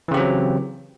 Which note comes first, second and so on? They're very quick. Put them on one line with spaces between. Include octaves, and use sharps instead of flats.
E3 C#3 G4 C4 F#3